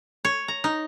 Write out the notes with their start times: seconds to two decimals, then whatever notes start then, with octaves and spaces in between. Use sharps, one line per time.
0.25 C#5
0.48 A#5
0.64 D#4